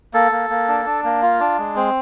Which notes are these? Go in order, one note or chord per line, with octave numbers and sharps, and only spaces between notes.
A#3 A4
A#3
A#3
D4
D4
A#3
F4
D4
G#3
C4